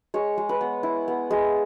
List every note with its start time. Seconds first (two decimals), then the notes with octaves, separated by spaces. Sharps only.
0.14 G#3 C#5
0.38 G#3
0.49 B4
0.61 B3
0.83 E4
1.08 B3
1.31 G#3